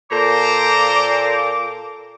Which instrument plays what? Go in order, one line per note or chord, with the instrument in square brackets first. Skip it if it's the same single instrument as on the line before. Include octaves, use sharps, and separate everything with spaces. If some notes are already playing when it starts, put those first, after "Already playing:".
[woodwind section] A#2 D6 [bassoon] A4 [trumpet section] C5 A#5